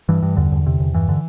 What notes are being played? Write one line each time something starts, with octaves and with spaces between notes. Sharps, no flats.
G2 E3
G2
E2 D3
E2
C3
E2
G2 E3
D3